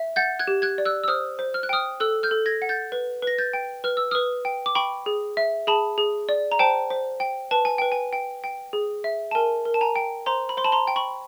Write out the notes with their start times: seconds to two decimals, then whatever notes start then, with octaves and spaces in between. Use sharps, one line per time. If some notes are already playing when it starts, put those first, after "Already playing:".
Already playing: E5
0.16 F#5 G6 A6
0.39 F#6 G#6
0.47 G4
0.62 F#6 G#6
0.78 D5
0.85 E6 F#6
1.04 E6
1.08 C5 D#6 F6
1.39 C5
1.54 F6
1.63 F#6
1.69 G5 D#6 F6
2.00 A4 E6 F#6
2.23 F6 G6
2.31 A4
2.46 G#6 A#6
2.62 F#5
2.69 G6 A6
2.92 B4
3.22 B4 A#6
3.38 G6 A6
3.53 G5
3.84 B4 F6
3.97 E6
4.11 B4 D#6 F6
4.45 G5
4.66 D6
4.75 G5 B5 C#6
5.06 G#4
5.37 E5
5.67 G#4 A5 B5
5.98 G#4
6.29 D5
6.52 A#5
6.59 C5 G5 A5
6.90 C5
7.20 G5
7.51 B4 A5
7.65 G#5
7.78 B4 G5
7.92 G#5
8.13 G5
8.44 G5
8.73 G#4
9.04 E5
9.31 A5
9.35 A#4 G#5
9.65 A#4
9.74 A5
9.81 G#5 A#5
9.96 G5
10.26 C5 A#5 C6
10.49 B5
10.57 C5 C6
10.64 A5 B5
10.72 A#5 C6
10.87 G5
10.96 B5 C#6